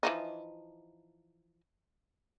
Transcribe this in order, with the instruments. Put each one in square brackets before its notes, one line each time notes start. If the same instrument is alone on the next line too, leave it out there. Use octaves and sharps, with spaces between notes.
[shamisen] E3 F3 D#4